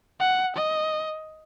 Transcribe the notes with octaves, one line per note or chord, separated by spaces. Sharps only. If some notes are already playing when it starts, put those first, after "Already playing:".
F#5
D#5